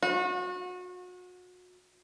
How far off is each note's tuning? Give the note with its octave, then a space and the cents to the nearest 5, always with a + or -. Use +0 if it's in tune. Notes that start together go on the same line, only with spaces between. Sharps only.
F#4 -35